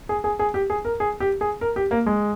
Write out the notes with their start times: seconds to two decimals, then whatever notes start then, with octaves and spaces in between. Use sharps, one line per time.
0.09 G#4
0.24 G#4
0.39 G#4
0.54 G4
0.70 G#4
0.85 A#4
1.00 G#4
1.20 G4
1.41 G#4
1.61 A#4
1.76 G4
1.91 A#3
2.06 G#3